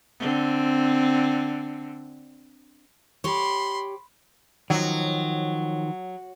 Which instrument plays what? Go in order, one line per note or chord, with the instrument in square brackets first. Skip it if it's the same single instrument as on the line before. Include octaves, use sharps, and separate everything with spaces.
[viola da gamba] D3 C4
[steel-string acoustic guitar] G4 C#5 [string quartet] B5 C6
[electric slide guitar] D#3 F3 [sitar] F#3